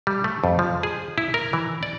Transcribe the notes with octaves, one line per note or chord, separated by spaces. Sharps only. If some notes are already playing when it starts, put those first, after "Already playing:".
G3
A3
F2
F3
G#4
E4
A#4
E3
D5